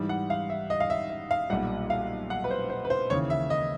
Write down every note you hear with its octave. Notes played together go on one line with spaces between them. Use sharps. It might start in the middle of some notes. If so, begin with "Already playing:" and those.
Already playing: G#2 E3 G3
F#5
F5
E5
D#5
F5
E5
E5
F5
B1 A#2 G3 F#5
F5
F#5
B4
C5
C5
B4
C5
D#2 C#3 E3 C#5
E5
D#5